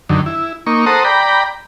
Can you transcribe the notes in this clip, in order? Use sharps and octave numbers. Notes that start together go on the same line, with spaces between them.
F#2 D3 D#3
E4
A#3 D#4 C#6
A4 C5 F#5 A#5 D#6
D5 G5 A#5 B5